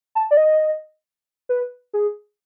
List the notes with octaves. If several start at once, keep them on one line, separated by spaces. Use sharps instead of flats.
A5
D5
D#5
B4
G#4